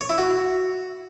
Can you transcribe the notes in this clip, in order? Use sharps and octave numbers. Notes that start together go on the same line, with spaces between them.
C#5
E4
F#4